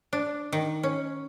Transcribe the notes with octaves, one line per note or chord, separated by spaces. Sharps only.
D4
D#3
C#4